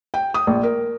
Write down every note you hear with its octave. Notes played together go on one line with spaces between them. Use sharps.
G5
D#6
A#1
A#4